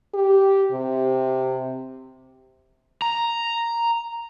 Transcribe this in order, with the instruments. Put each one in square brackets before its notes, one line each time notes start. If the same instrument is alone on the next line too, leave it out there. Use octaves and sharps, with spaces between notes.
[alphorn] G4
C3
[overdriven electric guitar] A#5